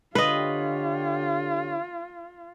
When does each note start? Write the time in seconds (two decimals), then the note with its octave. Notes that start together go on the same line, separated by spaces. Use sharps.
0.15 D3 F4 G4 B4 C#5 D#5